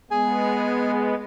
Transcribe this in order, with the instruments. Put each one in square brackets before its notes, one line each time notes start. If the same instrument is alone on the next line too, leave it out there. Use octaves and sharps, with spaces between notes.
[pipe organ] G#3 B3 [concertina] G#4 G#5